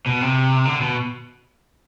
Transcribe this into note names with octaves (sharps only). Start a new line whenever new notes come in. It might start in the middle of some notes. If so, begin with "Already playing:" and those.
B2
C3
D3
B2